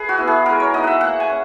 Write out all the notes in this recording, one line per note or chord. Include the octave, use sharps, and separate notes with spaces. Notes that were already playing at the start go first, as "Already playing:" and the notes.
Already playing: G#4 B4
F#4
B3 E4
G#4
G#3 A#4
C#5
B3 D#4 D#5
E5 F#5
A#3 F#5
G#5
C#4